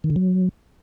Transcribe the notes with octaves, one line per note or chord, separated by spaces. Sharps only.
D#3
D3
F#3